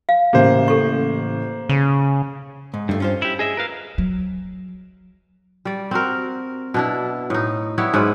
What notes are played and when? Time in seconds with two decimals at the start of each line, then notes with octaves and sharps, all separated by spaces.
0.09 F5
0.33 A1 C#3 A#3 G4 C5
0.68 A4 C#6
1.69 C#3 D#7
2.74 G#2
2.89 G2 D#3 A3 F4
3.00 C#4 F4 C5
3.22 E4 G4
3.39 G#4 D#5 E5
3.57 A#4 B4 F5
3.98 F#3
5.65 G3 D5
5.91 C4 F#4 A#4
6.74 B2 D4 E4
7.30 A2 D#4
7.78 G3 B3 E4 C#5
7.94 G#2 F#3 G#3 B4